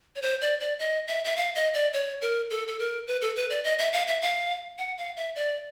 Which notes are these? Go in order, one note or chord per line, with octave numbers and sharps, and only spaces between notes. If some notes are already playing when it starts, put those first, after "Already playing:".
C#5
C5
D5
D5
D#5
E5
E5
F5
D#5
D5
C#5
A#4
A4
A4
A#4
B4
A4
B4
D5
D#5
E5
F5
E5
F5
F#5
F5
E5
D5